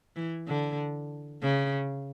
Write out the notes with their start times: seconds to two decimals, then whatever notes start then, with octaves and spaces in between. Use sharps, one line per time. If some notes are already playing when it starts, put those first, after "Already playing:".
0.16 E3
0.47 D3
1.42 C#3